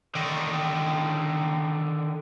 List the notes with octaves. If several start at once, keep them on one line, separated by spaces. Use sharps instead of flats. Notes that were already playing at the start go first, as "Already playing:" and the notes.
D3 D#3